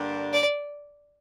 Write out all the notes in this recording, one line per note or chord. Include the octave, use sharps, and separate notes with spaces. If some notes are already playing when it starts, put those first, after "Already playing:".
Already playing: G2 D3 G3 A#3 D4
D5